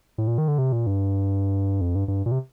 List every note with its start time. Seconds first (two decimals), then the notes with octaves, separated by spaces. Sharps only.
0.18 A2
0.27 A#2
0.38 D#3
0.48 D3
0.58 C3
0.72 A#2
0.86 G2
1.81 F2
1.95 G2
2.08 G2
2.26 A#2
2.32 C3